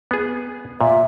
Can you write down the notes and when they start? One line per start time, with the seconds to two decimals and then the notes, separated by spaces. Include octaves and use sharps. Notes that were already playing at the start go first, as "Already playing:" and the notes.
0.11 B3 G#4
0.81 A#2 E5